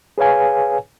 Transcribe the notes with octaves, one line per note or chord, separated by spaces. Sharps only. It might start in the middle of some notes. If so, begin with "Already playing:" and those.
G#4 B4 C#5 F5 G#5